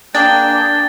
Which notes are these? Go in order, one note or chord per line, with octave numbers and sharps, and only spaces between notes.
A#3 D4 G#4 G5 G#5 A6